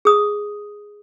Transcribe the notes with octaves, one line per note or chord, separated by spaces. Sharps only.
G#4 D#6